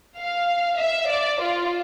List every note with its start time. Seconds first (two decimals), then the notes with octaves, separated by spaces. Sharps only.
0.18 F5
0.79 E5
1.09 D5
1.40 F4